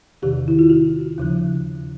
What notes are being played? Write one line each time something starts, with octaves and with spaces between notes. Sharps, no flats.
E2 C3 D#3 G4
E4
F4
F#4
D#2 C#3 F3